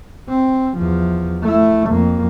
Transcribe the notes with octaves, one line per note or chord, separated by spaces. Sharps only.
C4
E2 F3
A3 E4
F2 A#3